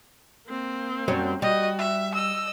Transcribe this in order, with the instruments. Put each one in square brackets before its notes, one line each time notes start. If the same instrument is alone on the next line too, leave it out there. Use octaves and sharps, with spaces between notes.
[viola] A#3 C4
[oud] F#2 G3 C#5
[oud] G3 [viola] F#4 [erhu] D#5
[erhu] E5
[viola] D#5 [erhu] E6